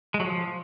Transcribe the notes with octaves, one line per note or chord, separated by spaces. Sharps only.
G#3
F#3
F3